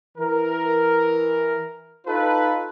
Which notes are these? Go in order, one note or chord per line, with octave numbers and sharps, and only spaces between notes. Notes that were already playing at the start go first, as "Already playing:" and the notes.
E3 A#4
D#4 F4 A4 B4